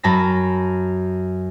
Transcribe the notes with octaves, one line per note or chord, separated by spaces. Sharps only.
F#2 A5 B5 A#6